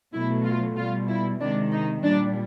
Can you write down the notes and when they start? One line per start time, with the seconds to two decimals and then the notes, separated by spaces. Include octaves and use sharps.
0.13 B2 F#3 A3 E4
0.45 F4
0.76 B2 G3 F4
1.08 E4
1.40 C3 D#3 G#3 D4
1.72 D#4
2.04 A#2 G3 D4